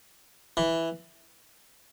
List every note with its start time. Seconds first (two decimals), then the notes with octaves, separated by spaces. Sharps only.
0.57 E3